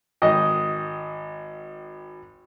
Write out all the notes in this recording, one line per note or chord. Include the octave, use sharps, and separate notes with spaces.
G#1 D#5 G5